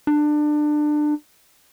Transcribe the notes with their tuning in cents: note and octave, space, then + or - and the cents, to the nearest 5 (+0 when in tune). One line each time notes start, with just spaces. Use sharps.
D4 +25